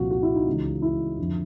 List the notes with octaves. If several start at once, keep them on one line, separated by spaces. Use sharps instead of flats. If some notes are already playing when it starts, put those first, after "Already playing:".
Already playing: C2 A#2 F3 F4 F#4
F#4
E4
D#4
C#2 C#3 E3
E4
F2 D3 F3